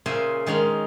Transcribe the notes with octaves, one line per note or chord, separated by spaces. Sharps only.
A#2 C#3 C5 E5 G#5
D#3 G#3 C#4 D#4